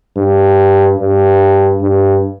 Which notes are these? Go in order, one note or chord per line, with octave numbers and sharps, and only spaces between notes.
G2
G2
G2